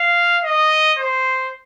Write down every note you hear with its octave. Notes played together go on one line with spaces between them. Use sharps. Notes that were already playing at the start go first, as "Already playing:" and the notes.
Already playing: F5
D#5
C5